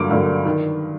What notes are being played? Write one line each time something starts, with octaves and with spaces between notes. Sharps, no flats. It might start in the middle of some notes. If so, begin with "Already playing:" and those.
Already playing: G2 D3 F#3 A#3 D6
G2 D3 F#3 A#3
D#3